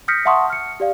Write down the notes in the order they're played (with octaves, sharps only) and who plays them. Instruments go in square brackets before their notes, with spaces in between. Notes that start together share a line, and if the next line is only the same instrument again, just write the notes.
[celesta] D#6 F6 G6 A#6 B6 C#7
E5 F#5 A5 C6 C#6 D#6
F6 C#7
G4 D5 F5